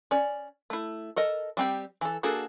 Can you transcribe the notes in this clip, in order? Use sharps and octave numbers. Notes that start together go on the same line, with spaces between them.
C#4 D5
A3 E4
A4 A#4 D#5
G3 C4 G4
E3 A4
A#3 D4 F#4 G#4 A4